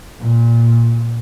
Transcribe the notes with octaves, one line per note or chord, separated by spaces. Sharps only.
A#2